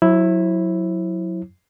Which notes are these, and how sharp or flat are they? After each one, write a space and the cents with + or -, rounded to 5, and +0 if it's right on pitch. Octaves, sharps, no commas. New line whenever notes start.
F#3 -15 E4 +0 C5 +40